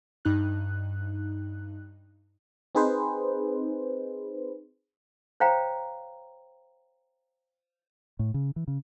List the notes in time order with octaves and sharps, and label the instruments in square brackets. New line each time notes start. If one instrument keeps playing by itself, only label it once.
[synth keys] G2 D#4 F#6
[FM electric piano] C4 D#4 G#4 B4 C5
[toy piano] C5 C#5 F5 G5 A#5
[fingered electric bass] A2
C#3
E3
C#3